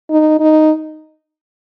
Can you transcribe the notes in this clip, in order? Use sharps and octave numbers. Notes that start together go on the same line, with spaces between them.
D#4
D#4